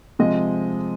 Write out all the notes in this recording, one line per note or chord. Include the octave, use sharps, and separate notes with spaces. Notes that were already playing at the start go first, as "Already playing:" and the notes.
C3 F3 G#3 D#5